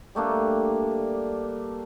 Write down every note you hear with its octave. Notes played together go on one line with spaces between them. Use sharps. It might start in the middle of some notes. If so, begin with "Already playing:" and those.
G3 A3 A#3 D4